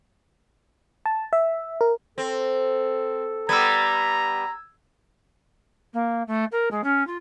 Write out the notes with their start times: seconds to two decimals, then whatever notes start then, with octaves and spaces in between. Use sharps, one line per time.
1.06 A5
1.33 E5
1.81 A#4
2.18 C4 A4
3.49 G3 B3 A#5 E6 G#6
5.94 A#3
6.27 A3
6.52 A#4
6.71 G#3
6.84 C#4
7.07 F4